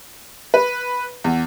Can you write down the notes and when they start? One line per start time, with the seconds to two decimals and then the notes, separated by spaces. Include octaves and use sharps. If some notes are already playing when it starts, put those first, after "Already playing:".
0.54 B4
1.24 E2